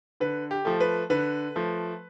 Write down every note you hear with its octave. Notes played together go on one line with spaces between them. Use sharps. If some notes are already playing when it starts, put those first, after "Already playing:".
D3 B4
G4
F3 A3
B4
D3 B4
F3 A3